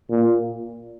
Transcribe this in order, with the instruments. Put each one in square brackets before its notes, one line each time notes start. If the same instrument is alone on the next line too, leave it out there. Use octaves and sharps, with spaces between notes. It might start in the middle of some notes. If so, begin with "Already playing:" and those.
[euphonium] A#2